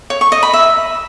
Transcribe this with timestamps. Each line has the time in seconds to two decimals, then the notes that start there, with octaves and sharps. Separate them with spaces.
0.10 C#5
0.21 C#6
0.32 D#5
0.43 B5
0.53 E5